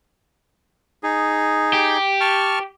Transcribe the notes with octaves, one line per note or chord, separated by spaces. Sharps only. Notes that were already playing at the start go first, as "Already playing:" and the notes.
D#4 G#4
G4
A5 C#6 F6